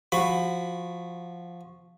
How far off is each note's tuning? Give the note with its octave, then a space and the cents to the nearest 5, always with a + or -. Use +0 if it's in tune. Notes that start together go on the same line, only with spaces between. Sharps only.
F3 +0 F#4 -10 B5 +15